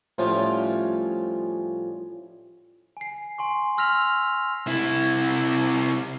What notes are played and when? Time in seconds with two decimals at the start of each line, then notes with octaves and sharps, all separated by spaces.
0.18 A2 F3 G3 C#4 F4
2.97 G#5 C7
3.38 G#5 C6 C#6
3.77 C6 E6 F6 A#6 B6 F7
4.67 C3 E4